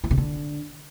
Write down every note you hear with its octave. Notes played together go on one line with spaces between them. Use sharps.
E3
C3
D3